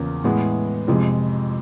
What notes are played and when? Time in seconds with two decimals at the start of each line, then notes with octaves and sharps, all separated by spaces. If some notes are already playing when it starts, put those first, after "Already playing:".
Already playing: E2 C#3 F3 A#3 C#4
0.24 A2 E3 G#3 B3
0.88 F2 C3 F3 G#3